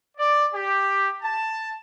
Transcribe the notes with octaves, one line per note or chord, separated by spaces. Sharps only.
D5
G4
A5